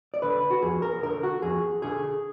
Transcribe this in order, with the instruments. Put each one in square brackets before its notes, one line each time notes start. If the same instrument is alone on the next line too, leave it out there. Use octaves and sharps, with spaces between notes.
[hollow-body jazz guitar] D5
D3 B4
F#4
F2 G#4
A#4
D3 A#4
F#4
F2 G#4
D3 G#4